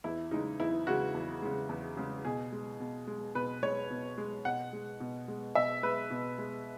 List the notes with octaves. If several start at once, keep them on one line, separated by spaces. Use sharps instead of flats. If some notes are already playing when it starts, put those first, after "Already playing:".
E2 E4
C#3 G#3 D#4
E2 E4
C#3 G#3 F#4
E2
C#3 G#3
E2
C#3 G#3
B2 G#4
G#3
B2
G#3
B2 B4
G#3 C#5
B2
G#3
B2 F#5
G#3
B2
G#3
B2 E5
G#3 B4
B2
G#3